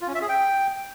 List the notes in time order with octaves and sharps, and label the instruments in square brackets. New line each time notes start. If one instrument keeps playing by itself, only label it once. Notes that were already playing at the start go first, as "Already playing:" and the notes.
[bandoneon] F4
C#4
E5
G#4
G5